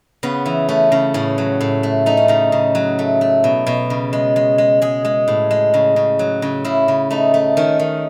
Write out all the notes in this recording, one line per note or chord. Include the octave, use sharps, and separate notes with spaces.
C#3 B3
E3
A3 C#4
C#3
A2 C#4
F#3
A2
A3
A3 D#4
C#4
C#3 D#4
C#3
F#3
A3
A3
B2
B2
C#3
G#3
G#3
G#3
G#3 G#4
G#3
A2
G#3
C#3
C#3
F#3
C#3
C#3 E4
C#3
A3 D#4
A3
D#3 C#4
D#3